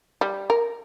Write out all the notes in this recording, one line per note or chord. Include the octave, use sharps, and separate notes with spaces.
G3
A#4